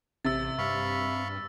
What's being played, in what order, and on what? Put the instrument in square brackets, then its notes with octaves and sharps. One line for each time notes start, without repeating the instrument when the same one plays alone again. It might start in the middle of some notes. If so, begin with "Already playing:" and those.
[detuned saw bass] A1 [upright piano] C3 [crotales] E6 A6
[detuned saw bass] G2 [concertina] F5 B5 C#6